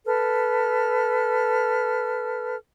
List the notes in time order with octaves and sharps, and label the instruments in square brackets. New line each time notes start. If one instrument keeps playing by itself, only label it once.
[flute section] A4 B4 F6